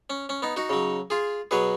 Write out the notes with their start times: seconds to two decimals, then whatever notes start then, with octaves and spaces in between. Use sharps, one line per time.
0.10 C#4
0.29 C#4
0.42 B3 D#4
0.56 D#4 F#4
0.70 C#3 F#3
1.10 F4 G#4
1.51 B2 F#3 G#4 B4